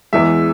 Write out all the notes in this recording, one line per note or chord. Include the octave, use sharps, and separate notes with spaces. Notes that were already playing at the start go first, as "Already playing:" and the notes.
E2 E3 G#3 E5